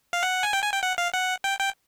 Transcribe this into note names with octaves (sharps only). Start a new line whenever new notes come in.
F5
F#5
G#5
G5
G#5
G5
F#5
F5
F#5
G5
G5